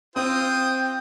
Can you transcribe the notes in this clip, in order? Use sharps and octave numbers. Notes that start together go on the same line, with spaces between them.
C4 F4 C5 G5 D#6